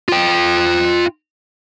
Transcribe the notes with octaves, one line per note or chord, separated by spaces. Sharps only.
F4 G5